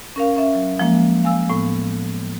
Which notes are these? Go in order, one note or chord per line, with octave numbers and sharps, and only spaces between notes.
C#4 A#4 F5
C#4 E5
F#3
F3 G#3 A#3
F5 G#5 E6
A2 B3